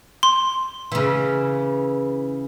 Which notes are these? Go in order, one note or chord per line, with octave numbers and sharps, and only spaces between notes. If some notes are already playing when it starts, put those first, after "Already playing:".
C6
C#3 E3